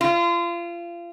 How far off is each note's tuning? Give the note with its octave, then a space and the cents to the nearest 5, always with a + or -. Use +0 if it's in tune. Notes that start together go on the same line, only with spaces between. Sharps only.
F4 -30